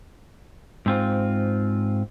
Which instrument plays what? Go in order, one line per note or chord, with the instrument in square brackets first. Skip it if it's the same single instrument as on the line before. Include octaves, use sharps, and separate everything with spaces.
[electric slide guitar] G#2 C4 F4